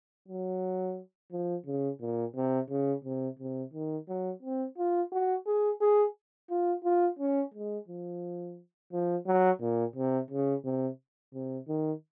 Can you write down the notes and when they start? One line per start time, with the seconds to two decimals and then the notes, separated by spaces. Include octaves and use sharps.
0.28 F#3
1.32 F3
1.66 C#3
2.01 A#2
2.36 C3
2.70 C#3
3.05 C3
3.39 C3
3.73 D#3
4.09 F#3
4.42 C4
4.78 F4
5.12 F#4
5.46 G#4
5.81 G#4
6.50 F4
6.84 F4
7.19 C#4
7.54 G#3
7.88 F3
8.92 F3
9.27 F#3
9.61 A#2
9.95 C3
10.31 C#3
10.65 C3
11.34 C3
11.68 D#3